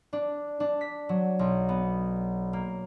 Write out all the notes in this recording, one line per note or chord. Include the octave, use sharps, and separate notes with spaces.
D4
D4
B6
F#3
B1
B3
A#3